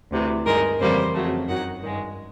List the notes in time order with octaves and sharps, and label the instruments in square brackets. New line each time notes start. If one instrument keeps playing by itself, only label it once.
[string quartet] D2 C3 E3
G2 D#3 G#3 A#4
F2 C#3 E3 G3 A#3 C5
F2 C#3 F#3 A3
F#2 D#3 F#3 F#5
G2 D#3 G#3